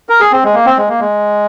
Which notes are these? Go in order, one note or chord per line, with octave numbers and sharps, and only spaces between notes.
A#4
G#4
C4
G#3
A#3
C4
G#3
A#3
G#3